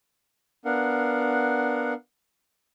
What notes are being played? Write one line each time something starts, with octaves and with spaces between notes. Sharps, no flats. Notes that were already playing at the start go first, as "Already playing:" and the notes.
B3 D4 A#4 F5 F#5